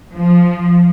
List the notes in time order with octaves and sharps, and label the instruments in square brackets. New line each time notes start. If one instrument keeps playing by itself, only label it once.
[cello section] F3